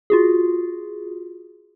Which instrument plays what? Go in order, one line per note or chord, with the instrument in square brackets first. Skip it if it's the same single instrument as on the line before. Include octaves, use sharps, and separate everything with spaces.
[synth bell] F4 F#4 G#4